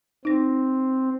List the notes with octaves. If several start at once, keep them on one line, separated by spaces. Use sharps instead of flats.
C4 D#4 A#6